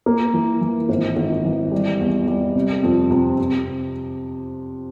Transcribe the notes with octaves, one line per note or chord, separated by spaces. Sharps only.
A#3
E3
E3
G#1
G#1
E3
G3
E2
G3
C3
F2
C3
C3